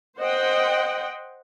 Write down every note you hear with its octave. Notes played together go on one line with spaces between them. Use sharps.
C5 D#5 F#5 G5